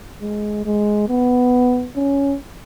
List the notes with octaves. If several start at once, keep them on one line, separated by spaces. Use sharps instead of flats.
G#3
G#3
B3
C#4